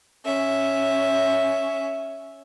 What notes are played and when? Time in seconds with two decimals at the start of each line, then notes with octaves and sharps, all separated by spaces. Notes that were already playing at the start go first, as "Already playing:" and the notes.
0.25 C#4 E5